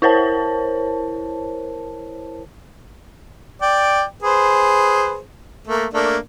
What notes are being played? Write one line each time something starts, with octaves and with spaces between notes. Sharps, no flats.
E4 A#4 C5 C#5 A5
D5 G5
G#4 B4 C5
A3 A#3
A3 A#3 D4